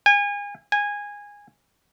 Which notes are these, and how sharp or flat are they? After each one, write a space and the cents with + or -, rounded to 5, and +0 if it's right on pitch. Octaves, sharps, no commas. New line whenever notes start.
G#5 -30
G#5 -15